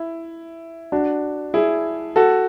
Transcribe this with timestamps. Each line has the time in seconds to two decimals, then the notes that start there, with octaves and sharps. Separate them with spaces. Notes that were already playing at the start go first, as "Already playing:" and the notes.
Already playing: E4
0.92 D4 F#4
1.54 E4 G#4
2.16 F#4 A4